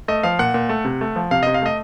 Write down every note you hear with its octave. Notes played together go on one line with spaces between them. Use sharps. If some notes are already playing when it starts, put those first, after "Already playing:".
A3 D#5
F3 F5
A#2 F#5
A#2
A3
C3
A3
F3
C3 F5
C3 D#5
F5
A3 D#5